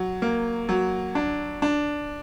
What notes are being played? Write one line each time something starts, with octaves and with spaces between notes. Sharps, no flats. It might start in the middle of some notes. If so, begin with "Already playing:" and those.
Already playing: F#3
A#3
F#3
D4
D4